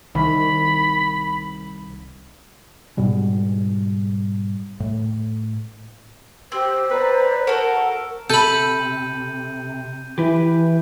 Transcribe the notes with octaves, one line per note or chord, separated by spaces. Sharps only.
C2 D#3 B5
G#2 B2 G3 G#3
A2
C4 G4 C5
B4 D5 A#5
F#4 A4 A#4 C#6
C3 A4 B5 G6 D#7
E3 G4 B4